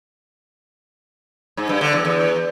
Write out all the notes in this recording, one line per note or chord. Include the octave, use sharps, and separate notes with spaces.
G#2
G2
D3
E2
E2